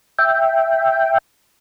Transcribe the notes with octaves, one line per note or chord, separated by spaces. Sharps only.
E5 G5